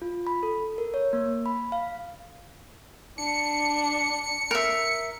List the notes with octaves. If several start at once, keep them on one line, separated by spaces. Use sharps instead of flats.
F4
B5
A4
A#4
C#5
A#3
B5
F5
D4 C#7
A#4 E5